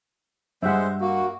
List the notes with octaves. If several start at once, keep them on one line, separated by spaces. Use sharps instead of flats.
G2 G#3 C5 E5 F#5
A#3 F#4